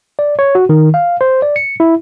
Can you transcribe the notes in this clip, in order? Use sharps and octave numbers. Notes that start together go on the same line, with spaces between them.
D5
C#5
F#4
D#3
F5
C5
D5
C#7
E4